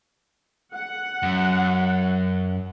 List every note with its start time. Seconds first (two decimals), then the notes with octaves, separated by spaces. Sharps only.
0.73 F#5
1.23 F#2